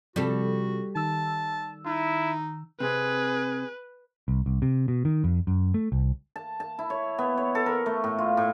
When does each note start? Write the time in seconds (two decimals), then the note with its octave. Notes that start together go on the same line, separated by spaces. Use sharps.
0.16 C3 F3 G3 F#4 A4
0.96 D#3 A5 E6
1.86 D#4 E4
2.80 C3 C4 G#4 B4
4.28 C2
4.46 C2
4.62 C3
4.88 B2
5.05 D#3
5.24 F2
5.47 F#2
5.74 A3
5.92 C2
6.36 A5
6.60 A5
6.79 E4
6.90 C#5
7.19 B3
7.37 C#5
7.55 A4
7.66 A#4
7.86 A3
8.04 A2
8.19 F4
8.37 A2